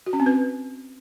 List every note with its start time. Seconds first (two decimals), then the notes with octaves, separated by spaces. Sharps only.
0.06 F#4
0.13 C#4
0.20 C4
0.26 B4